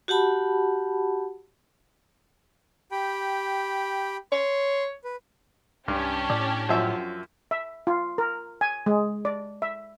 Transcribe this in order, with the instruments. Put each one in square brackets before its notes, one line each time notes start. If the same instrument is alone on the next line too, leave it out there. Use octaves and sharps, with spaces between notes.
[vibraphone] F#4 G4 F#5 A5 B5
[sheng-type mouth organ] G4 G5 B5
[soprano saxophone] C#5 [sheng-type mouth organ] C6
[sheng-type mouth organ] B4
[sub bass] C2 [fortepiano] G2 [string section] C#4 D4 G4
[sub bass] A2 [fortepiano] D5
[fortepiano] F#2 F3 E5
[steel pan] E5
F4
A#4
G#5
G#3
D5
E5